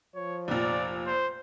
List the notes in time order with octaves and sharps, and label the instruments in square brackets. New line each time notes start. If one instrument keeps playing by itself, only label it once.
[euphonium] F3 [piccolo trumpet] C#5
[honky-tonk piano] F1 A#2 [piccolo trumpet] D5
[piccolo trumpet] C5